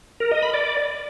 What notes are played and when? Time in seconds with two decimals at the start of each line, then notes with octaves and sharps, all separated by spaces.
0.20 A#4
0.31 D#5
0.42 B5
0.54 D5